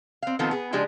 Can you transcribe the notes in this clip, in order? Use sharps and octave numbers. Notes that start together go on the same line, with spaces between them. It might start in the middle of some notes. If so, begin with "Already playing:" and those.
C4 F5
D#3 F3 B3 C4 F4 A4
B3 G#4
C#3 F3 G#3 D4 G4 G#4